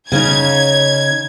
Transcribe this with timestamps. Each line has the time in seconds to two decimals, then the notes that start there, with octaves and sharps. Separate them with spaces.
0.12 C#3 C#4 D#4 G#6